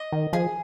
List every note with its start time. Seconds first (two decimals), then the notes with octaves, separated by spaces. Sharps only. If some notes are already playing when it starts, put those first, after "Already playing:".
Already playing: D#5
0.12 D#3
0.33 F3 G#4